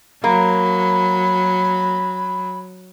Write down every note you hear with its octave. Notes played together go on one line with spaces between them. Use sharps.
F#3 A#3 B5